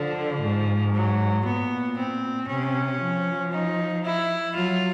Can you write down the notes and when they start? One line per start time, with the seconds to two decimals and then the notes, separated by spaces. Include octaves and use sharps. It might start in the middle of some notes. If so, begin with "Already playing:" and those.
Already playing: D3 F3
0.42 G#2
0.94 F#3
1.45 A#2 B3
1.98 C4
2.48 C3 C#4
3.01 F3
3.52 D#4
4.04 E4
4.55 F#3 F4